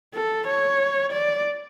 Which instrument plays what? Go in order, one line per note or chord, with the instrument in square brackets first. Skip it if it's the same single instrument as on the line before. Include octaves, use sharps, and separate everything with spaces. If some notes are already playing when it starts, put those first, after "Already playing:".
[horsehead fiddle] A4
C#5
D5